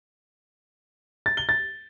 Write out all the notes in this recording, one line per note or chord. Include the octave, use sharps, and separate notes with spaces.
A6
G7
A6